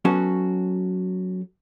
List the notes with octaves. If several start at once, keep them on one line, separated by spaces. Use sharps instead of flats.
F#3 B3 C#4 F#4 A4